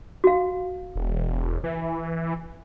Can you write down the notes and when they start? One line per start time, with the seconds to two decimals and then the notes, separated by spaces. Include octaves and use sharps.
0.24 F#4 F5
0.96 E1
1.64 E3